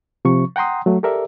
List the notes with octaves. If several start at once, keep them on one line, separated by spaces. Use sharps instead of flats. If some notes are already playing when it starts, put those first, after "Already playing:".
C3 F3 C#6
F#5 G5 A#5 C6 D#6
F#3 A3
G4 A4 A#4 D5 E5